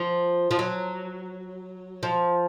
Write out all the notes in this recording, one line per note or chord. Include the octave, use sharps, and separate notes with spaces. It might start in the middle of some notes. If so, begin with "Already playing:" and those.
Already playing: F3
F3
F#3
F3